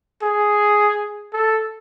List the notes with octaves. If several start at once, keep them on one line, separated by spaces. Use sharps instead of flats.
G#4
A4